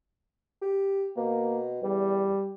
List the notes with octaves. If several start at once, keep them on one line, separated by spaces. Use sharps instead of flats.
G4
B2 A#3
E2 G3